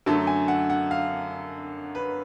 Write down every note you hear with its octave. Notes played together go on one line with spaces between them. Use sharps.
F#2 D3 F#3 A3 A5
G#5
F#5
F#5
F5
B4